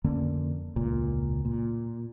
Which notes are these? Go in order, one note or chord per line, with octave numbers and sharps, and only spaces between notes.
F2 D3 A#3 C#4
E1 C#2 A#2
A#2